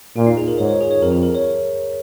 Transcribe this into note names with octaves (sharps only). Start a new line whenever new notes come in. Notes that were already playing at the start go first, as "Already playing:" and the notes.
A#2 F4
D#4
G#4
A#4
G#2 C#5
C#5
G#4
C#5
F2 A#4
G#4
A#4
C#5